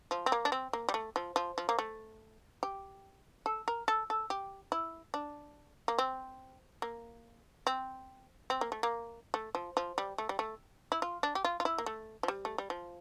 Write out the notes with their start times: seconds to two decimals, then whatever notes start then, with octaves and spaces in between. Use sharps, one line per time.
0.11 F3
0.26 C4
0.32 A#3
0.45 D4
0.52 C4
0.73 A#3
0.89 G3
0.94 A3
1.16 F3
1.36 F3
1.58 F3
1.69 A#3
1.79 A3
2.63 G4
3.46 A4
3.68 A#4
3.88 A4
4.10 A4
4.30 G4
4.72 E4
5.14 D4
5.88 A#3
5.98 C4
6.82 A#3
7.67 C4
8.50 C4
8.61 A#3
8.72 A3
8.83 A#3
9.34 A3
9.55 F3
9.77 F3
9.98 G3
10.18 A3
10.29 G3
10.39 A3
10.92 E4
11.02 F4
11.23 D4
11.35 G4
11.44 F4
11.60 F4
11.65 E4
11.78 A#3
11.86 A3
12.23 F3
12.28 G3
12.45 A3
12.58 G3
12.70 F3